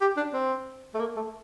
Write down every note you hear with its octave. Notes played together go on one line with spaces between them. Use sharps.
G4
D4
C4
A3
A#3
A3